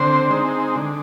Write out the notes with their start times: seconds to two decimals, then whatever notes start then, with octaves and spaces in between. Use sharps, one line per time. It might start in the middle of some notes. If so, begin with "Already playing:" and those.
Already playing: D3 C4 C5
0.30 G#3 C4 D#4
0.76 D3